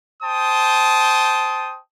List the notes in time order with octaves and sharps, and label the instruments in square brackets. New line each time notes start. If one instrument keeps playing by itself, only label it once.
[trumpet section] C5 G5 A5 D#6